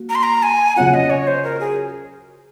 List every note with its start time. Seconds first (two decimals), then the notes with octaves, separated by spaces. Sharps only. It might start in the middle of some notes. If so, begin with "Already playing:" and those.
Already playing: A#3 F#4
0.09 A#5
0.15 C6
0.23 A#5
0.43 G#5
0.76 C#3 F#3 C#4 F4 F#5
0.94 D#5
1.10 C#5
1.27 C5
1.44 A#4
1.60 G#4